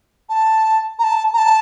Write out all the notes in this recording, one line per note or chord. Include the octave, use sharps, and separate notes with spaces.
A5
A#5
A5
A#5
A5